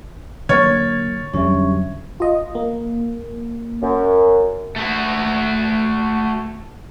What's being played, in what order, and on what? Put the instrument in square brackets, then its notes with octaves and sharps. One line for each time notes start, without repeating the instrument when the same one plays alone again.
[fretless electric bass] D3 F#3 A#3 [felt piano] C#5 [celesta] F6 A6 [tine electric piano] G#6
[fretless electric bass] F2 D3 G3 [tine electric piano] F#3 C#4 [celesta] E5 C#6
[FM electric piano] F4 D#5
A#3
[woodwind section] F#2
[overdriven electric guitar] A3 F#4